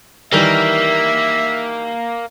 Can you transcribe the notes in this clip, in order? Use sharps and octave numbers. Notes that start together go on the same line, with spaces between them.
D#3 E3 G3 A#3 E5